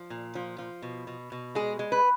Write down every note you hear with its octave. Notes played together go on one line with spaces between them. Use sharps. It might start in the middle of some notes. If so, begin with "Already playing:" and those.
Already playing: F3
A#2
F3
F3
B2
B2
B2
G#3 G#4
G#3
B4